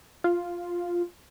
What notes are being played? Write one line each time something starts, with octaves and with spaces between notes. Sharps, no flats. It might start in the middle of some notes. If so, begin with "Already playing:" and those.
F4